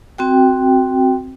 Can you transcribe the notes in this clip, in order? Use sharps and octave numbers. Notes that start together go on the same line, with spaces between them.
C4 F#4 G5